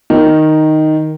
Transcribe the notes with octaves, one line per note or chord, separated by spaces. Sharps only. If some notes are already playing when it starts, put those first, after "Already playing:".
D#3